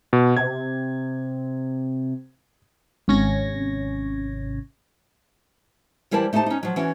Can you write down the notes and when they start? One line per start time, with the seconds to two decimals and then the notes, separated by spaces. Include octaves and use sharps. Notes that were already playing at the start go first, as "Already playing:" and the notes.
0.13 B2
0.37 C3 G#6
3.08 G#1 C3 C#4 C#6 G#6 A#6
6.11 E3 G3 E4 A#4 C5 A5
6.33 A3 D#4 G4 C5 A5
6.46 C#4 D#4
6.63 F3 F#3
6.76 E3 C#4 F#4